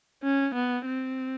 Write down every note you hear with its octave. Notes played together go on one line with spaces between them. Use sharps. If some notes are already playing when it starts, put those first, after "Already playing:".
C#4
B3
C4